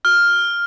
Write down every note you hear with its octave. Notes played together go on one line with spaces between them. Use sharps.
F6